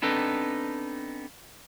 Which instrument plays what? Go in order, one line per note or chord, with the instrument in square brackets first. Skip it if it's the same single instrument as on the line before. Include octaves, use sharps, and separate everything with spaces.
[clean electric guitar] B3 C4 D4 D#4 A4 B4